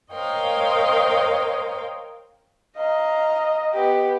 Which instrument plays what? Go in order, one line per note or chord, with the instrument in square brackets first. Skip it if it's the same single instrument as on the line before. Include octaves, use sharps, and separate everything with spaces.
[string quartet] A#4 C5 C#5 D#5 F5 G5
[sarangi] D#5 [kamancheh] F5 A#5
[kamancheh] B3 G4